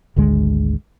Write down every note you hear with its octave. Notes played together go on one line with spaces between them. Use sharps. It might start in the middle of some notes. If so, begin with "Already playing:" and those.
G#1 D2 D3 G#3